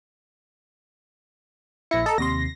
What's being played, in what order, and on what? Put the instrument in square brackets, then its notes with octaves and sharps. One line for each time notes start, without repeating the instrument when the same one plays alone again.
[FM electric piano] A#1 A#6 C#7 [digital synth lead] E4
[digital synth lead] A4 [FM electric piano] D#5 A#5
[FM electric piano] D#2 C3 C6 [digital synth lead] A#6